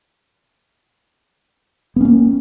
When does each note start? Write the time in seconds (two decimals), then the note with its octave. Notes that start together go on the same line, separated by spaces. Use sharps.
1.96 B3
2.01 C#4
2.05 A#3